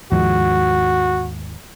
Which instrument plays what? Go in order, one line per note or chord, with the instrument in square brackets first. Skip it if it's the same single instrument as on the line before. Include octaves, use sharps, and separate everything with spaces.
[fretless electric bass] D#2 G#2 F3 [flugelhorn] F#4